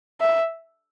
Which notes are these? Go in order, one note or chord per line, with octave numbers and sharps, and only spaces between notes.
E5